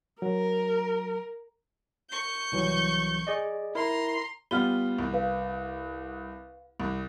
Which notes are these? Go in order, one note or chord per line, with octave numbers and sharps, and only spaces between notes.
F#3 A#4
C#6 G6
C2 E3 F#3
G#4 D5 D#5
E4 A#4 A#5 C6
G3 B3 F4 F6 G7
C2
B4 F5
C2